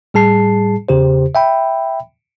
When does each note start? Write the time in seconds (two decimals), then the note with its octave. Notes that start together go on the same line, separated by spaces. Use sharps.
0.14 A2 G3 G#4 A5 C7
0.89 E2 C#3 G4 C5
1.35 E5 G5 B5